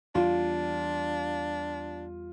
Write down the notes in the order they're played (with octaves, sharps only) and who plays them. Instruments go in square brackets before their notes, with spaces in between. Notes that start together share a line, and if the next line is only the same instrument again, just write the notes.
[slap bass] E2 G3 [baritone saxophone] D4 [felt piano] F4